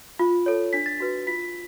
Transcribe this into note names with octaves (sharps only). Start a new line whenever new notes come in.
F4
A4 C#5
D4 B6
A6
F#4 B4 B6
F4 B6